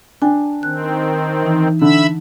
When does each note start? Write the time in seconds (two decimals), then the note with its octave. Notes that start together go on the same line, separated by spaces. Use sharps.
0.22 D4 G5 G#5
0.63 D#3 C4 F#6
1.43 E3 D#4
1.81 D3 E5 B5 E6